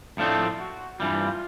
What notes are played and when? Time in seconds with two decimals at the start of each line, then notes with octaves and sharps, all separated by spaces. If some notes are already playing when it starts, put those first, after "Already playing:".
0.18 A2 F3 A3 C4 D4
0.60 F#4
1.00 G2 E3 G3 F4